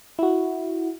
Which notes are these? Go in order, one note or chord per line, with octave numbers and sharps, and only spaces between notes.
E4 F#4